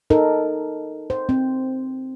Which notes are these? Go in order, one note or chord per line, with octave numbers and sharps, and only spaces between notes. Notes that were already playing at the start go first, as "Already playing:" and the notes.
D#4 A4 A#4
C5
C4